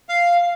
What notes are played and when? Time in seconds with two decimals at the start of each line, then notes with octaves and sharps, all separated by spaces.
0.09 F5